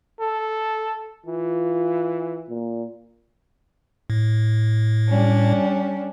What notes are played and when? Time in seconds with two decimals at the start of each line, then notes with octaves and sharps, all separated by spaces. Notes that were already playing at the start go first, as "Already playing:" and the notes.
0.20 A4
1.26 E3 F4
2.49 A#2
4.10 A2
5.09 G3 C#4 D4